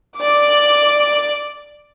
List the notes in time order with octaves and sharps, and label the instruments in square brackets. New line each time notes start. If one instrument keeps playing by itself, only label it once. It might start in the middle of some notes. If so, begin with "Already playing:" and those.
[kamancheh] D5 D6